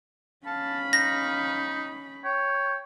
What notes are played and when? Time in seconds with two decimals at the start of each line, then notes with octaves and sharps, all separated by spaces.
0.46 C#4 F5 A5 B5
0.93 D#4 A#6
2.24 C#5 G5